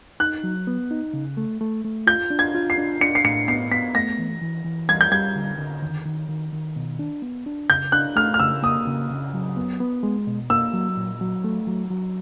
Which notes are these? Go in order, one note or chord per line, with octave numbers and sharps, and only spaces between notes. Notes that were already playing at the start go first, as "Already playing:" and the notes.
D#4 F#6
F#3
B3
D#4
C#3
A3
A3
A3
F4 G6
D4
G#6
F4
C7
D4
D4 C#7
C7
A2 C#7
B3 C7
B3 B6
A3 A#6
E3
E3
E3
G3 G#6
G6
G3 G#6
D3
D3
D#3
D#3
D#3
D#3
B2
D4
B3
D4
C#3 G6
D4 F#6
A3 F6
F6
C#3 E6
A#3 D#6
C#3
C#3
F#3
B3
B3
G#3
B2
A#3 E6
F#3
A#2
F#3
A3
F#3
F#3